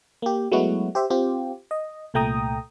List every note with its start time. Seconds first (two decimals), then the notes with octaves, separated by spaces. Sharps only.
0.22 A#3 G4
0.52 F#3 G#3 A3 B3 E4 F#4
0.95 G4 C5 E5
1.10 C4 F4 G4
1.71 D#5
2.14 C2 A#2 A3 G5 A#5 D#6